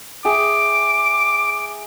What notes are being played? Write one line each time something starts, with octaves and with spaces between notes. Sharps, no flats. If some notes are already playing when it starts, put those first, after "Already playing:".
G#4 E5 G5 D6